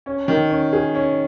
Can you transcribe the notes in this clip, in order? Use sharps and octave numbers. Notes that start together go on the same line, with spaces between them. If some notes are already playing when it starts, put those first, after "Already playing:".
C#4
D#3
C#4
G#4
C#4